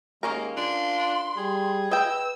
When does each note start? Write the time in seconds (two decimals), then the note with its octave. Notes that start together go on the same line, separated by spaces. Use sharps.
0.23 D#2 G#3 A#3 C#4 A#4
0.57 D4 F4 C6
1.37 G3 G#4
1.92 B4 D#5 G5 E6